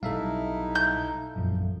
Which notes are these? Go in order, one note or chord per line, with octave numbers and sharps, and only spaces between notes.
B1 G3 D#4 E4 A4 E5 F5
G6
A#1 F#2 F3